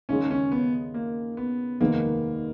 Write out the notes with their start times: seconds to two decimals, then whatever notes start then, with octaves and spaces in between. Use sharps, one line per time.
0.09 D#2 C#3 G#3 C#4
0.31 C#4
0.52 B3
0.94 A#3
1.37 B3
1.80 F1 D#2 D#3 G#3 A#3 B3